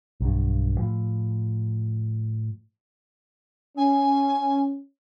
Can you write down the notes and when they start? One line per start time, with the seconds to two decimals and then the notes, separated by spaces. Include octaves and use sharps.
0.21 B1 G2
0.78 A2 F3
3.77 C#4 G#5